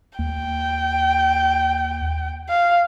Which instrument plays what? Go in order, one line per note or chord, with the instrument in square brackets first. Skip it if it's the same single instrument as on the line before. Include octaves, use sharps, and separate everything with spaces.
[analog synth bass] D#2 [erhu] G5
[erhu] F5